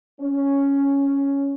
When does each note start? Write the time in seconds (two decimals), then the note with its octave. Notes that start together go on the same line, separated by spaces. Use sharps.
0.21 C#4